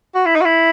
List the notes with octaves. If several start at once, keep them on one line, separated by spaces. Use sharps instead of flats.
F#4
E4
D#4
F#4
E4